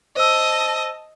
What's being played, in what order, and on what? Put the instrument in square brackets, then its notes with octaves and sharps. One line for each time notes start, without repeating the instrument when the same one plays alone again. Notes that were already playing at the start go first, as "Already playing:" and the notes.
[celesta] C5 E6 [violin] D#5 A5